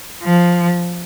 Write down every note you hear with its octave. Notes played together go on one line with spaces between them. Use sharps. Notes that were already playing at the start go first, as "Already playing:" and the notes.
F3